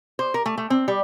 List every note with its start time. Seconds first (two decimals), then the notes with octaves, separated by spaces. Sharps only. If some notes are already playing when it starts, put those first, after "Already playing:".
0.19 C5
0.34 A#4
0.46 A3
0.58 A3
0.70 C4
0.88 G3